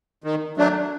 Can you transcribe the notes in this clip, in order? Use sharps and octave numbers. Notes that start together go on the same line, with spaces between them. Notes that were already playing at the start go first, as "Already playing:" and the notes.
D#3
F#3 A3 D4